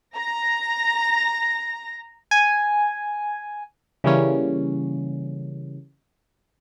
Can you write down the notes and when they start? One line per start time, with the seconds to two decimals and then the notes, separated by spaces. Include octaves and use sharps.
0.15 A#5 A#6
2.31 G#5
4.04 C#3 E3 G3 A#3 C#4